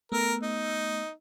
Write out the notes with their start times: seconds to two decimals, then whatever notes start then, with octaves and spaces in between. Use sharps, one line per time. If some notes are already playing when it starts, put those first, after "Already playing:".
0.12 A3 B3 A#4 E6
0.43 D#4